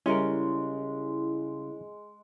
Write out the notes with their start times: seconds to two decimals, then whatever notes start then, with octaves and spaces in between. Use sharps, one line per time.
0.06 C#3 G3 G#3 C#4 E4 A#4